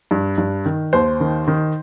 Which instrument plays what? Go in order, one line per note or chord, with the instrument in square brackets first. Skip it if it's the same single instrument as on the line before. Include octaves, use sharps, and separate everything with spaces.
[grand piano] G2
G2
D#3
D#2 C5
D#3
D#3